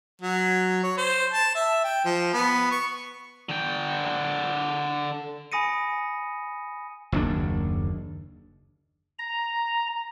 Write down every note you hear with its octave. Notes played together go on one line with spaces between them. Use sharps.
F#3
C#5
C5
A5
E5
G5
F3
B3
C#6
D3 G5
G#5 B5 D#6 A#6 C#7 D#7
F#1 D#2 D4
A#5